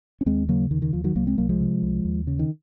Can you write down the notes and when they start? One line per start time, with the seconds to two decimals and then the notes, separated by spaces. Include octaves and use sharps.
0.21 C#4
0.26 D#2 G#3 C4
0.48 C#3 F#3 A#3
0.71 D#2 D#3
0.82 D#3
0.93 D#2 F3
1.04 D#3 F#3
1.15 C2 F#3 A#3
1.27 G#3 C4
1.38 C2 F#3 A#3
1.49 F3 G#3
1.60 C3
1.83 C2
2.05 D#2
2.27 C#3
2.39 D#3